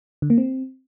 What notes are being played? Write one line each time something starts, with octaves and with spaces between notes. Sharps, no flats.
D3
A#3
C4